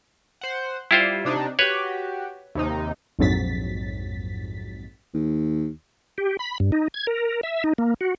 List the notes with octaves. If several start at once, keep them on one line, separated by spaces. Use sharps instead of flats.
C5 F#5
G3 E4 F4 C5
C3 D4 D#4
F#4 G4 B4 C#5
D#2 C3 D#4
A#1 F2 G#2 F#3 A6 B6
D#2
G4
B5
G2
D#4
G#6
A#4
E5
D#4
A#3
F#4